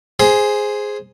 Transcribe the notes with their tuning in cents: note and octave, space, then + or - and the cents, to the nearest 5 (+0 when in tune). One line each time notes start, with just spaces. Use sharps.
G#4 +0 C5 +0 A#5 +40